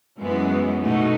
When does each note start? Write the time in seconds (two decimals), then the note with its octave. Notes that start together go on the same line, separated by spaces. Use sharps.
0.19 F#2 E3 G#3 B3
0.82 B2 A3 D#4 F#4